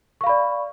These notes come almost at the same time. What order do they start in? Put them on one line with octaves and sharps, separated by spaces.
C#6 F5 B5 D5